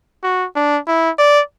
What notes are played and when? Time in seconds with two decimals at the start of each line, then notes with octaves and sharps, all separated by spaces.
0.23 F#4
0.55 D4
0.88 E4
1.19 D5